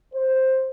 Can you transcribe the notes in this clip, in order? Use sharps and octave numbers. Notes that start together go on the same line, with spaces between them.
C5